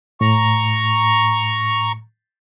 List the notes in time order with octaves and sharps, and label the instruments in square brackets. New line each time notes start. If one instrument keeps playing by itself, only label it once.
[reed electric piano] A2 [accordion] A#5 C#6